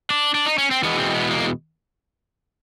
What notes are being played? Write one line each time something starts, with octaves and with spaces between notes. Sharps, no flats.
D4
D4
D#4
C#4
C4
E2 B2 G#3 B3
C4
C4
B3
A#3